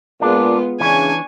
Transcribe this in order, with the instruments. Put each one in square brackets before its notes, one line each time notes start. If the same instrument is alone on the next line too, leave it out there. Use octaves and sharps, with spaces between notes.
[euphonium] A#2 [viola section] G#3 B3 F4 [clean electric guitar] D4
[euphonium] C#3 [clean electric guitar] E3 C#4 [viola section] D4 [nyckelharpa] G#5 C#6